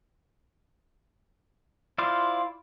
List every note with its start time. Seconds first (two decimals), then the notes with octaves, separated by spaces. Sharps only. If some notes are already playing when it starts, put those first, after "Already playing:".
1.98 E4 F4 C5 D5 F5